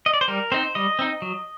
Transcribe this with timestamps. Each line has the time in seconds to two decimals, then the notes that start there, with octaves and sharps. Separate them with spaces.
0.06 D#5
0.14 D5
0.21 C5
0.28 G3 A#4
0.52 C4 D#4 C5
0.75 G3 D#5
0.99 C4 D#4
1.22 F#3